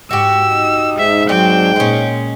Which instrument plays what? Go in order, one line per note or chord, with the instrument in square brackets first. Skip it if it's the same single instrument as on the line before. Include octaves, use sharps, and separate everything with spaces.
[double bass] G#2 [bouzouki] F#4 G4 [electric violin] E6
[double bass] D#4
[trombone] G#2 [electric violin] E5
[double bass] F#3 [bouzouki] C4 D4 [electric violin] G5
[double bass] A#2 [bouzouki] G#3 C#4